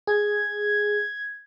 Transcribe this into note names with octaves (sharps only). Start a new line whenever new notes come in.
G#4 G#6